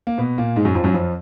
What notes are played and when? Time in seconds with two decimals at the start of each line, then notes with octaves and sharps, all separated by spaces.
0.07 A#3
0.18 B2 B3
0.38 A#2 A#3
0.56 G#2 G#3
0.65 F#2 F#3
0.75 F2 F3
0.84 F#2 F#3
0.94 F2 F3